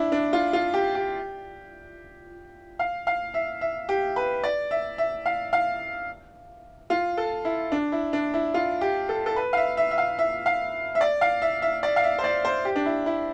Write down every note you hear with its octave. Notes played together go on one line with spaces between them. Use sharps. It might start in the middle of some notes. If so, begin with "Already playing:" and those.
Already playing: D4 E4
D4
F4
F4
G4
G4
F5
F5
E5
E5
G4
B4
D5
E5
E5
F5
F5
F4
A4
E4
D4
E4
D4
E4
F4
G4
A4
A4
B4
F5
E5
E5
E5
F5
E5
F5
E5
D5
F5
E5
E5
D5
F5
E5
C5
D5
C5
G4
D4
E4
E4